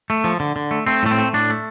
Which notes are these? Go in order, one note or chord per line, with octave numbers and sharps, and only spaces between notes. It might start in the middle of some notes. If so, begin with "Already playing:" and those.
A3
F3
D3
D3
A3
A3 C4
A2 A3
C4
A3
A2 D4
A3